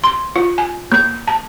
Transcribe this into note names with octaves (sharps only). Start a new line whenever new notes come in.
C6
F4
G#5
A#3
A5